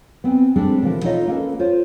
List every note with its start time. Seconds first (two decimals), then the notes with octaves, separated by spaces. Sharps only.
0.24 B3 C4 G#5
0.56 G3 G#3 C4 D4 A4
0.82 B2 D3 E3 F3 G4 A#4
1.04 D#4 F4 A4 C#5 D#5 F5
1.27 A#3 C#4 A4 B4
1.59 F4 C5 C#5